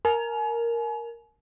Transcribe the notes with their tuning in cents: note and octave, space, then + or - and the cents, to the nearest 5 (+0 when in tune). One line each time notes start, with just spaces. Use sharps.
A#4 +0 G#5 +40